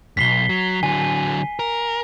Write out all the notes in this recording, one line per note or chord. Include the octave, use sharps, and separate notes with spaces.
B1 F#2 B6 C7 G7
F#3
D3 F#3 G#5
G#5
A#4